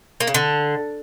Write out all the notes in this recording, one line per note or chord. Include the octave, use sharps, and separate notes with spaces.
A#3
C#3
D3